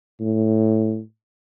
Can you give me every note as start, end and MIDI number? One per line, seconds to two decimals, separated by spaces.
0.20 1.00 45